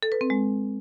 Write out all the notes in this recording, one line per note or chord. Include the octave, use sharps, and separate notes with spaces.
A4
B4
C4
G#3